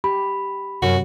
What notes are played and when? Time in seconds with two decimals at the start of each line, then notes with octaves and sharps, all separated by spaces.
0.04 G4 B5
0.82 F#2 C3 F#3 F#4